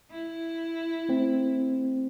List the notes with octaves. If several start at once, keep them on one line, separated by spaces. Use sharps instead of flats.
E4
A3 C4